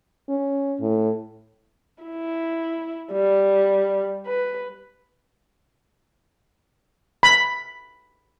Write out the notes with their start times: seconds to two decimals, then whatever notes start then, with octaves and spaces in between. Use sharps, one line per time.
0.29 C#4
0.81 A2
2.03 E4
3.12 G3
4.26 B4
7.23 B5